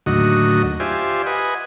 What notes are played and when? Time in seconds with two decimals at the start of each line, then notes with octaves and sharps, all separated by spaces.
0.06 D#2 A2 D3 F#3 F#4 D#5
0.80 F4 G4 C5 D5 E5 G#5
1.26 B4 D#5 F#5 G#5